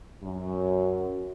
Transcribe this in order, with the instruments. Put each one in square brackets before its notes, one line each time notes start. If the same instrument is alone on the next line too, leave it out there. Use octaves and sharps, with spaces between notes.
[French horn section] F#2